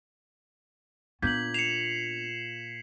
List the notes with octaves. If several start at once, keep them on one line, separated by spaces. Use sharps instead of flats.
A#2 B3 D4 G6 G#6 B6 F#7
C7 C#7 E7 F7